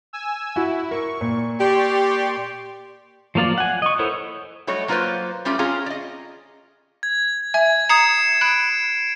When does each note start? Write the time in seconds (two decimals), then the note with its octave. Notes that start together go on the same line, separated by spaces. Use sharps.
0.13 G#5 E6
0.56 E4 F#4
0.91 A#4 C#6
1.21 A#2
1.60 G4 D5 C6 C#6
3.35 F3 F#3 A#3 F4 D5
3.58 F#5 G#5
3.82 D#5 C#6
3.99 E4 A4 A#4 C5 C#5
4.67 F#3 G3 A3 C#5 D#5
4.88 F#3 A#3 F4 A4 B4 C5
5.45 G3 A3 C#4 F4 G4
5.59 C4 C#4 F4 G#4 A#5
5.86 D5 D#5
7.03 G#6
7.54 E5 G#5 G#6
7.89 A#5 D#6 G#6 C7 C#7 E7
8.41 B5 F#6 D7